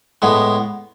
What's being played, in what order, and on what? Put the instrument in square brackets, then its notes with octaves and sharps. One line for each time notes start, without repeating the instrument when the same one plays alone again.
[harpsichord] A2 G#3 B3